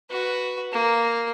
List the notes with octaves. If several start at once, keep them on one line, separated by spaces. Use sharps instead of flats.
F#4 B4
A#3